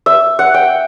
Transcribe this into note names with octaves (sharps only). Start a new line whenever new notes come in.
E5
F#5
G5